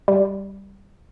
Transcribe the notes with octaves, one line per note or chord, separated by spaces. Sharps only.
G3